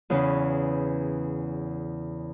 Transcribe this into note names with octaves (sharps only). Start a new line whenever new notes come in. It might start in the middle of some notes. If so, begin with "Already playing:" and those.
E2 C#3 C#4 B4